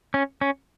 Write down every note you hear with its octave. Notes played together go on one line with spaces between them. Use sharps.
C#4
C#4